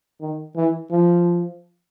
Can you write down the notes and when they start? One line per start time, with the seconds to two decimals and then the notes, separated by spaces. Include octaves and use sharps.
0.21 D#3
0.56 E3
0.91 F3